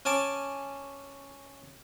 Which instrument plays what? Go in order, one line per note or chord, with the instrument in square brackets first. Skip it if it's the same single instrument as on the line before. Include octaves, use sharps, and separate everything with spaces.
[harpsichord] C#4 G#5 A5 D6